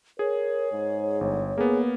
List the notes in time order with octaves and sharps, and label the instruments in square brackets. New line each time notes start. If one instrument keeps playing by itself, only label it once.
[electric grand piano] G#4 [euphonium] A#4 [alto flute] C#5
[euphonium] G#2
[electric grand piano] G1
[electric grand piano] A#3 B3 [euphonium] G#4